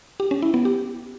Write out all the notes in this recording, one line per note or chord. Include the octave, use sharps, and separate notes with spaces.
G4
C#4
E4
B3
G4